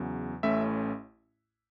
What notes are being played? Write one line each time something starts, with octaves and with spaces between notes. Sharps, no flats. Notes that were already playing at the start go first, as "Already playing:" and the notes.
Already playing: E2 C#3 F#3
A1 A2 A3 C#4 E5